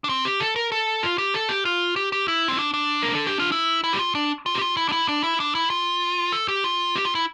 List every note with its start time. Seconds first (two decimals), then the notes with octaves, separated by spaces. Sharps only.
0.04 D4
0.09 C4
0.25 G4
0.40 A4
0.56 A#4
0.72 A4
1.03 F4
1.18 G4
1.34 A4
1.49 G4
1.65 F4
1.96 G4
2.12 G4
2.28 E4
2.48 C4
2.59 D4
2.74 D4
3.02 A#4
3.15 A4
3.27 G4
3.39 F4
3.52 E4
3.84 E4
3.93 G4
3.99 F4
4.15 D4
4.46 F4
4.55 G4
4.61 F4
4.77 E4
4.89 D4
4.92 E4
5.08 D4
5.23 E4
5.40 D4
5.55 E4
5.70 F4
6.32 A4
6.48 G4
6.64 F4
6.96 G4
7.05 F4
7.15 E4